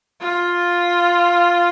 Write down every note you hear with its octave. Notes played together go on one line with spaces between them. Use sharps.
F4